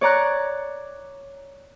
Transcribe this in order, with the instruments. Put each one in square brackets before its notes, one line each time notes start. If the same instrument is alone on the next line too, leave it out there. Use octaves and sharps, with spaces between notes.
[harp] C#5 D5 A#5 F#6